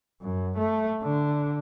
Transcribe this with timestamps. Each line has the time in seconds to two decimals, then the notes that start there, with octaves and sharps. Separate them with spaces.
0.21 F#2
0.57 A3
1.03 D3